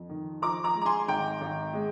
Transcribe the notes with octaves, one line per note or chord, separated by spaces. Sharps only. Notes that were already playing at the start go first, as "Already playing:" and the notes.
Already playing: F2
D#3
F3 A#5 D6
A#5 D6
G#3
A#5
G#5 C6
G#1 G5 A#5
G#1
G#3